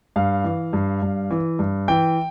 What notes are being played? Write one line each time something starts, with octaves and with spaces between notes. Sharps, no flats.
G2 F5
E3
G2
G2
E3
G2
E3 G5